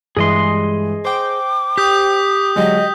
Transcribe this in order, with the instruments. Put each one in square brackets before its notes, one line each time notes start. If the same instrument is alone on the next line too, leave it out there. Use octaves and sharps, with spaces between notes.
[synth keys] G2 E3 G#3 [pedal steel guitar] G#4 D#5 C6
[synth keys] C5 G5 [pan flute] D6
[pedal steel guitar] G4 [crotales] D#6 G6 B6
[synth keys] D3 F#3 G#3 [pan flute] D#5